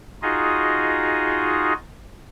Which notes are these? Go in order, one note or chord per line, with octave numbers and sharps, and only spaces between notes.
D#4 F4 F#4 G#4 D#5